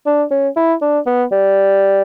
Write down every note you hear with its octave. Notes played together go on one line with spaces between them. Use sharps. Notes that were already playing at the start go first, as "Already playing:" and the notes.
D4
C#4
E4
D4
B3
G3